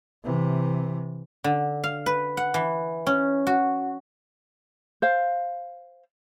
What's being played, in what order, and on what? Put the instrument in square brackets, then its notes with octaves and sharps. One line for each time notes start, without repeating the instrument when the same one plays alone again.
[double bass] C3 E3
[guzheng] D3
F5
B4
F#5
E3
C#4
F#4
[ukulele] C5 F5